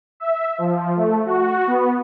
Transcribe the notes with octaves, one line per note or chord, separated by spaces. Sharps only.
E5
F3
A3
F#4
B3